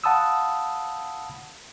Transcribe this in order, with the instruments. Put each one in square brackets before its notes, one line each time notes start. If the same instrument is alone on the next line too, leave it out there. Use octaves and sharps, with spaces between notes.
[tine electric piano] F5 F#5 A5 B5 D#6 E6